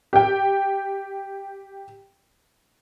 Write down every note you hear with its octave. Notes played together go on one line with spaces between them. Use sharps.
G4 G5